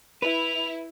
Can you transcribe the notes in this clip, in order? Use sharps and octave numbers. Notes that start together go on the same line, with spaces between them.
E4 B4 F7